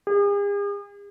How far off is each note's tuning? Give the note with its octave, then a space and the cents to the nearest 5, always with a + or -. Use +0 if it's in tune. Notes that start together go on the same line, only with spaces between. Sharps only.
G#4 -45